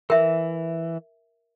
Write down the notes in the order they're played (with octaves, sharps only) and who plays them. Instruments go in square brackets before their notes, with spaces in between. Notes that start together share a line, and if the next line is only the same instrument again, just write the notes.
[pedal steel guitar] E3 [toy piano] A#4 E5